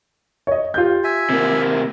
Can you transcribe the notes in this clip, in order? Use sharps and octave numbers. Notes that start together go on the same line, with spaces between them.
C#5 D#5
F4 G4 G6
E5 G#5
C3 A#3